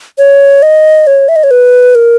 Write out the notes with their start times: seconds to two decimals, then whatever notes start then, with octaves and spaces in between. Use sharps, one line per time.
0.18 C#5
0.62 D#5
1.07 C#5
1.28 E5
1.36 D#5
1.44 C#5
1.51 B4
1.95 A#4